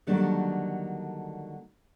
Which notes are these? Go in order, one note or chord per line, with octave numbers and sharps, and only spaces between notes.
D3 D#3 F#3 G3 A#3 D4